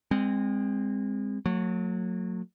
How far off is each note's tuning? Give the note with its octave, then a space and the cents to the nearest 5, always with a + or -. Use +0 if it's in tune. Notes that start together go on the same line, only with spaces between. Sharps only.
G#3 -30 C4 +0
F#3 -25 A3 +40